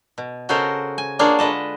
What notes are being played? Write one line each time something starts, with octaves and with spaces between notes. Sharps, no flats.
B2
C#3 F#4 A4 A#4 C5 D#5
G#5
A#3 D4 F4 G#4 C#5 F#5
D3 G#3 B4 D#5 A5